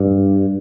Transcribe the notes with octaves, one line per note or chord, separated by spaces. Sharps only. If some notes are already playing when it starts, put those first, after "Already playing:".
Already playing: G2